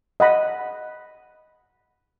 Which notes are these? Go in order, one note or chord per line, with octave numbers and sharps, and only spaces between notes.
D#5 F#5 B5